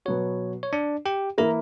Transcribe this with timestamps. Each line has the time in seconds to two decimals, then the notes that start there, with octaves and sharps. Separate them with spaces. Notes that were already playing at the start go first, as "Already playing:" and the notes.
0.05 B2 F#3 B3 F#4 C#5
0.63 C#5
0.73 D4 D5
1.06 G4 G5
1.38 E3 A#3 E4 A#4 A#5